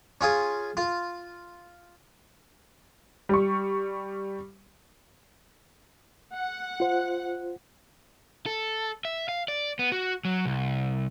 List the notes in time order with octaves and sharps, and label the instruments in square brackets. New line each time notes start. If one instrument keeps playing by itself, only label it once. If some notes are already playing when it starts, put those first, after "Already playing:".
[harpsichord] C#4 F4 G#4
F4
[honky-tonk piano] G3 C#6
[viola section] F#5
[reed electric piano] F4 C5
[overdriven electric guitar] A4
E5
F5
D5
B3
F#4
F#3
C2